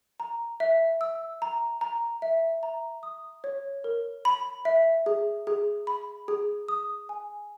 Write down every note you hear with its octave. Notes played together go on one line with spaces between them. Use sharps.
A#5
E5
E6
A#5
A#5
E5
A#5
D#6
C#5
A#4
B5
E5
G#4
G#4
B5
G#4
D#6
G#5